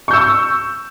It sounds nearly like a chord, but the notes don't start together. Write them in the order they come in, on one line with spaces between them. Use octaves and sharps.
C#6 G6 E6